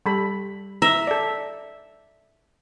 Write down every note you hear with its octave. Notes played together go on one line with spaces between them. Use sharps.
G3 A4 B5
E5 A#5
A4 D5